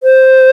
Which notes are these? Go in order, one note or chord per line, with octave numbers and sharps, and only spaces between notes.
C5